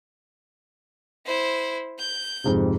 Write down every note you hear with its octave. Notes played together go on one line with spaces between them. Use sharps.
E4 C5
G6
F2 G#2 C3